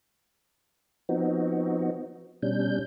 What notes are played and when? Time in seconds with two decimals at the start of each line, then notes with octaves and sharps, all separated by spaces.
1.09 F3 B3 C4 D#4 F#4
2.42 B2 G3 C#4 D4 G6